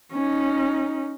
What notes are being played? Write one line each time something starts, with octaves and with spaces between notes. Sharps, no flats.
C#4 D#4